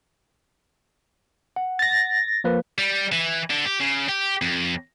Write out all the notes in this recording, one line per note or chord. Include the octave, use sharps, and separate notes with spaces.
F#5
A6 A#6
F3 A#3 B4
G3
E3
D3
G4
C#3
G4
F2